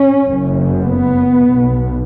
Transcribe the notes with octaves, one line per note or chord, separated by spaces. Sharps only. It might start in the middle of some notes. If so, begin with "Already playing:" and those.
Already playing: C#4
F#1 F#2 C#3
B3
B1 B2